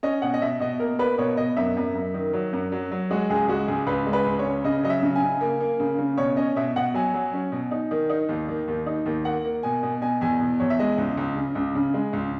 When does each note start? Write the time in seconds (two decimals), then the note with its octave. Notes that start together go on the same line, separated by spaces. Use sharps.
0.03 C#4 D#5
0.22 B2 F#5
0.34 D#5
0.41 B2 E5
0.60 B2 D#5
0.80 A#3 A#4
0.99 A#3 B4
1.18 B2 C#5
1.37 B2 D#5
1.57 F#2 E5
1.77 F#2
1.95 F#2
2.14 D#3
2.33 F#3
2.53 F#2
2.72 F#3
2.91 F#3
3.11 G#3 F#4
3.30 C#2 G#4
3.49 G#3 F#4
3.68 C#2 G#4
3.87 C#2 B4
4.07 G#3
4.13 B4
4.26 C#2
4.39 C#5
4.45 C#4
4.64 C#3 D#5
4.83 F#3 D#5
4.90 E5
5.03 C#3
5.15 G#5
5.22 C#3
5.41 A#3
5.61 A#3
5.80 C#3
5.99 C#3
6.18 B2 C#5
6.37 C#4 D#5
6.56 B2 E5
6.76 B2 F#5
6.94 F#3 G#5
7.14 F#3
7.33 C#4
7.52 B2
7.71 D#4
7.91 D#3
8.10 D#4
8.29 D#2
8.49 D#3
8.68 D#2
8.86 D#4
9.06 D#2
9.25 A#3 F#5
9.45 A#3
9.63 B2 G#5
9.83 B2
10.02 B2 G#5
10.21 E2 G#5
10.40 B2
10.60 E2 C#5
10.70 E5
10.79 G#3 D#5
10.98 C#2
11.17 C#2
11.37 C#3
11.55 C#2
11.75 C#3
11.94 G#3
12.13 C#2